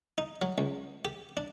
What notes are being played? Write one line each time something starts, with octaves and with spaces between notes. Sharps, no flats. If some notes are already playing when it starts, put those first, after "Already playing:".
D#4
F#3
C#2
G4
D4